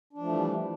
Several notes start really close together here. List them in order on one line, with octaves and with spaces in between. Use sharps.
D4 F3 A3 E3 G3